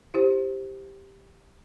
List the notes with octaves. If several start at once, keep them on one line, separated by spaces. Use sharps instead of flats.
E4 G4 C5